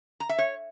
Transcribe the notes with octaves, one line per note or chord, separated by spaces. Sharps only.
A#5
E5
C#5